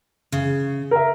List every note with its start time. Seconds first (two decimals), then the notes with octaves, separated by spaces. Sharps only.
0.32 C#3
0.91 A#4 E5